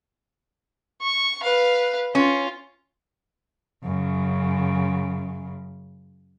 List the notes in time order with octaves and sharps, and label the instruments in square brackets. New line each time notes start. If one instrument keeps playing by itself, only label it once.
[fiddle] C#6
B4 F5
[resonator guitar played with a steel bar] C#4 [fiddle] F4
[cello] F#2 C#3